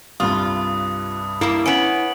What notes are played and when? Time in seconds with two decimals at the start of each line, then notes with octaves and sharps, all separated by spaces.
0.20 C2 G2 F4 D#6
1.41 G3 A#3 E4
1.66 B3 C#4 D7 F#7